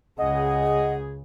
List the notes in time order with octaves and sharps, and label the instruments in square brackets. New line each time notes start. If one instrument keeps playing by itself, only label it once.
[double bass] C#2 C#3 [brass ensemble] G#4 [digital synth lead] D#5 [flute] F#5